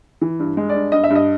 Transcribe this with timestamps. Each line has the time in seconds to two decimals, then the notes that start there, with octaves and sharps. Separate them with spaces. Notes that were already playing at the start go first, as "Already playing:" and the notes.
0.21 E3
0.39 G2
0.57 G#3
0.69 D5
0.75 G2
0.92 G2 D#5
1.04 E5
1.10 G2
1.15 D#5